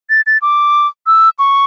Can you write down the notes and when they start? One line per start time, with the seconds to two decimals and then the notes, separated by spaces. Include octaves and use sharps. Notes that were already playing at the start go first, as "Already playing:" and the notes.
0.10 A6
0.27 A6
0.42 D6
1.07 E6
1.39 C#6